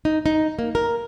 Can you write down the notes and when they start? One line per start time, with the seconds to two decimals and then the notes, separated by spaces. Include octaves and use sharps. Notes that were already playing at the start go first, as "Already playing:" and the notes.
0.05 D#4
0.26 D#4
0.59 A#3
0.75 A#4